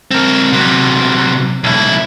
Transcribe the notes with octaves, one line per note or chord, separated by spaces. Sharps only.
C4 A#4
C3 F#3
B1 E4